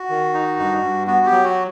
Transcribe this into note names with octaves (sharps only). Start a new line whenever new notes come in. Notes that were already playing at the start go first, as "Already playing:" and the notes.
Already playing: F#4
D#3
D#4
G2
G2
B3 F#4
G4
F#3
F#4